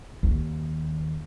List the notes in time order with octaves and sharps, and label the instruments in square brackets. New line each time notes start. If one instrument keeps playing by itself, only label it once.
[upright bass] D#2